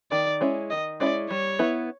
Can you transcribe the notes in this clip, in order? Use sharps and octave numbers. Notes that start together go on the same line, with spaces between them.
D#3 D5
G#3 C#4 E4
D#3 D#5
G#3 C#4 E4 D5
G3 C#5
B3 E4